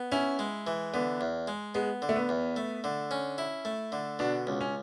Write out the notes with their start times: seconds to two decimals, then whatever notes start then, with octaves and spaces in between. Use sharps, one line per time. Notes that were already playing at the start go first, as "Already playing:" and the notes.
Already playing: B3
0.12 C#4 E4
0.39 G#3
0.67 E3
0.94 D3 B3
1.21 E2
1.47 G#3
1.75 G#3 B3
2.02 D3
2.09 A3
2.16 B3
2.29 E2
2.56 A3
2.84 D3
3.11 C#4
3.38 E4
3.65 A3
3.92 D3
4.19 B2 D4
4.47 C#2
4.61 C#4